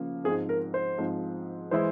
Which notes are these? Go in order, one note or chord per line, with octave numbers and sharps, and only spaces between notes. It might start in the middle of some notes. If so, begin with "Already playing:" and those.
Already playing: C#3 F3 A#3
G#2 F3 G#3 C4 G#4
A#4
C5
G#2 F3 G#3 C4
E3 G#3 E4 C5